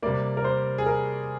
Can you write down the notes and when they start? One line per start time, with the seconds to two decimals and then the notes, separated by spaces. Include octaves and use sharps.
0.03 C3 G3 A#3 D5
0.37 A#4
0.44 C5
0.78 G#4
0.86 A#4